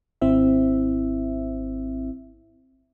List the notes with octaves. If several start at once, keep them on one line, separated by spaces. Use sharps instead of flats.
G#1 C4 E4 E5